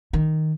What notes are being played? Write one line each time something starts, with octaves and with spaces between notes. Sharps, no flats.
D#3